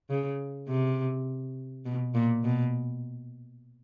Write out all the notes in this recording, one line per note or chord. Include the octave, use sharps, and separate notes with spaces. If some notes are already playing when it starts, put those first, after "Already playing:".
C#3
C3
B2
A#2
B2